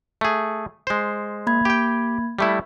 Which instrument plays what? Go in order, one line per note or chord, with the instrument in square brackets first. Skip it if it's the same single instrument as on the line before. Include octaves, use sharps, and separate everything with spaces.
[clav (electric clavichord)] A3 G#4
G#3 C5
[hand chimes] A#3 B5 G#6
[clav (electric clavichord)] G4 G5
G3 A3 E4